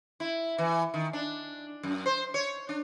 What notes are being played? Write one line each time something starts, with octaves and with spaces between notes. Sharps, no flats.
E4
E3
D#3
D4
F#2
C5
C#5
D4